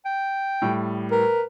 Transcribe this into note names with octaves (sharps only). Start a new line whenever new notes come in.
G5
A2 G3
A#4 B4